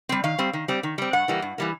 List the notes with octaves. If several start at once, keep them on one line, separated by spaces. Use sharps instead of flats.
G3 C4
D#3 F5
G3 C4
D#3
G3 C4
D#3
G3 C4
G2 F#5
E3 G3 A#3
G2
E3 G3 A#3